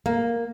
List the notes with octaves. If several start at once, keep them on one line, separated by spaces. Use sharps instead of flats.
A#3